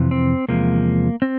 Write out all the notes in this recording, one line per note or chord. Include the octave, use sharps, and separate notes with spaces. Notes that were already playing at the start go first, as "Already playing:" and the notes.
Already playing: F2 C3 E3
C4
E2 C3 F3 G#3 A#3
C4